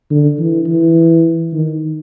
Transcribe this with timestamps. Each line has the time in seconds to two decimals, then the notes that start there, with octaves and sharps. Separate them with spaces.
0.11 D3
0.39 E3
0.67 E3
1.53 D#3